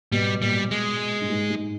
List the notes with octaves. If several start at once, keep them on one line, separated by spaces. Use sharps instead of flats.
B2 G3
A#2 G3
G#3
G2
G#2
G#2